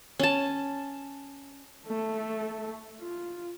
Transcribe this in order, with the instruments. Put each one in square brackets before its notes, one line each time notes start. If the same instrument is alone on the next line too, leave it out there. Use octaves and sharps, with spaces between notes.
[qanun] C#4 A5
[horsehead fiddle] A3 A4
F4